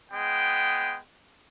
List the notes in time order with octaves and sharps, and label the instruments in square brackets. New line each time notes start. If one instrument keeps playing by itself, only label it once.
[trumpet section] G#3 B3 G5